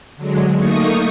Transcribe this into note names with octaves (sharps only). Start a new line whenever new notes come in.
D3 F#3 G#3
A3 A#3 D#4 C#6 D#6